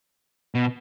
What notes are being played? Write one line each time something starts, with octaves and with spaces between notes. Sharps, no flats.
B2